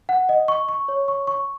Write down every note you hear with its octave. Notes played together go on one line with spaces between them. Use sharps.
F#5
D#5
C#6
C#6
C#5
C#6
C#6